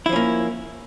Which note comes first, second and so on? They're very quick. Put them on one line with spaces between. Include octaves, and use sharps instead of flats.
E4 F3 C#4 A#3